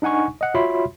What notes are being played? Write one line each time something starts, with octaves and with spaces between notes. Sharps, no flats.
D4 D#4 F#5 G#5 C#6
D#5 F#5
F4 F#4 C#5 E5 B5 C6